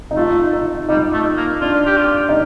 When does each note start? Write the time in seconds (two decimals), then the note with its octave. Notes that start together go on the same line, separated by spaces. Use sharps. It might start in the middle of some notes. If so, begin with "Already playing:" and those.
0.11 D#4
0.17 A3 F4
0.53 D#4
0.89 G3 D#4
1.13 A3
1.37 A#3
1.61 D4 F4
1.86 G4
1.97 F4
2.29 D#4